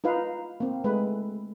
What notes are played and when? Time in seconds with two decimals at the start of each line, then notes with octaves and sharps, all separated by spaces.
0.04 D#4 F4 B4 F5
0.60 A#3 C4
0.84 G#3 A3 B4